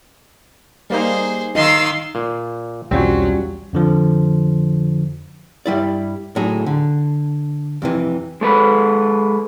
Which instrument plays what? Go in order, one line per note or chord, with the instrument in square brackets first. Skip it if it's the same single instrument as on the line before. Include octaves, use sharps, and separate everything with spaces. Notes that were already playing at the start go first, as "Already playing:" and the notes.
[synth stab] G3 A#3 D#4 [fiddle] G#4 C5
[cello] D#3 F5 [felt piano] D#5 [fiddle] C6 E6
[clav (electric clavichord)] A#2
[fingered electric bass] B1 E2 [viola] F#3 [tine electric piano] G3 C#4 F4 [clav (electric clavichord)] C4
[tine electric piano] F2 D3 F3
[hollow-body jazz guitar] G2 G3 E4 D5
A2 F#3 D#4 G#4
D3
F2 C3 E3
[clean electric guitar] G#3 A4 B4